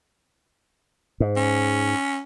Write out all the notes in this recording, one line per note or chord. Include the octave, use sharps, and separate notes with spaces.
G#2
C#4